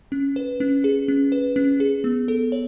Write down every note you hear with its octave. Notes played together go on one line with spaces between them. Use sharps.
C#4
B4
C#4
G#4
C#4
B4
C#4
G#4
B3
A4
C#5